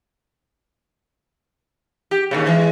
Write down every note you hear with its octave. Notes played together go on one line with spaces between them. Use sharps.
G4
D#2 A#2 C#3
E3 G#3